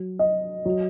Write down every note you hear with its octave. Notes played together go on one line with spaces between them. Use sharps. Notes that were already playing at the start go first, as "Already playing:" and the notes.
Already playing: F#3
D#5
F#3